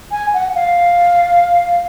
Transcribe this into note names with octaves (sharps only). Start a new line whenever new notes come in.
G#5
F#5
F5